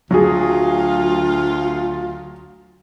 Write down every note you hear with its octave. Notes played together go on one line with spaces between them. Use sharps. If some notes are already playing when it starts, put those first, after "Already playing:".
D2 F#3 F4 G#4